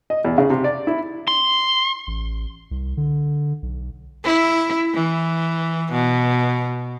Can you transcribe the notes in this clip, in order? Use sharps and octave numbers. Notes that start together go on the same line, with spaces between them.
D#5
E2
C#3
C3
D5
E4
C6
A1
C2
D3
B1
E4
E3
B2